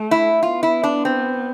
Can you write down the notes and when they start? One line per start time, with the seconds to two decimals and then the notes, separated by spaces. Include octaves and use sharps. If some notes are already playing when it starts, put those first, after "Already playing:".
Already playing: A3
0.11 E4
0.43 B3 F4
0.63 E4
0.83 D4
1.05 C4